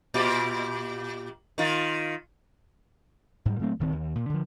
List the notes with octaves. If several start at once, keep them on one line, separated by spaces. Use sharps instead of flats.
A#2 F4 G4
D#3 F4
G#2 G3
A#2 F#3 A3 C4
D1 D#3 C4
D#2
A#2
D3 F3